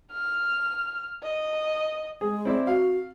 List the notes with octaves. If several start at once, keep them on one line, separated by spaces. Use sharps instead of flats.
F6
D#5
G#3 G#4
C4 E4 D5
F#4 F5